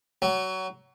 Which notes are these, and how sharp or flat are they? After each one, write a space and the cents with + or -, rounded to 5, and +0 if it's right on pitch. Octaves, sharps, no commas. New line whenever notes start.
F#3 +20